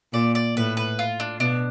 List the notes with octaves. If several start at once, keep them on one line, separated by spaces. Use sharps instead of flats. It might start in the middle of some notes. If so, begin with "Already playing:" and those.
A#2 D5
D5
A2 B4
B4
F4
D4
B2 D4